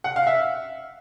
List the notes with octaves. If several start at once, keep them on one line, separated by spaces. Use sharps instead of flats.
F#5
F5
E5